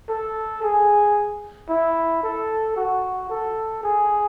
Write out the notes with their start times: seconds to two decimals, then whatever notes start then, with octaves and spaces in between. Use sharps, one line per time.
0.09 A4
0.63 G#4
1.70 E4
2.23 A4
2.77 F#4
3.30 A4
3.83 G#4